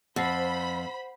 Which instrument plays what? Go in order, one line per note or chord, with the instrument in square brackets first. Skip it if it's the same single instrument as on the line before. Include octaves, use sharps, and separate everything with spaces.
[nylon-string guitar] F2 [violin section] C5 B5 [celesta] F#5 C7